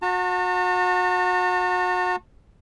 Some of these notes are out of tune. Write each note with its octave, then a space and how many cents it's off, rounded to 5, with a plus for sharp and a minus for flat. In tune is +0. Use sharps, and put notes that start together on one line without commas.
F#4 -30 A5 +45